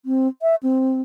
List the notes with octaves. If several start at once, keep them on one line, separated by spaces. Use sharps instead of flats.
C4
E5
C4